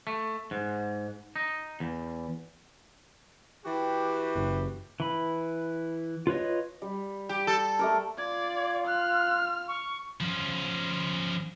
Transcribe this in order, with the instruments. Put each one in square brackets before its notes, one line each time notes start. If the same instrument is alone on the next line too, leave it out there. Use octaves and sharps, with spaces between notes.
[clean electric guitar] A3
G#2
D#4
E2
[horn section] E3 F#4 G4
[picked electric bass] F#1
[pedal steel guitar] E3 B5
F4 B4 C#5 D#5
[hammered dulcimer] G3
[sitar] G4
A4
[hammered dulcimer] A3 G4 A#4
[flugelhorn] F4 [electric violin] D5 [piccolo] G#6
[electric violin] F6 [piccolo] F#6
[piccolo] C#6
[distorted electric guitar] F3 C#4